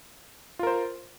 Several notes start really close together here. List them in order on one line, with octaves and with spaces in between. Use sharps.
F4 A#4 C5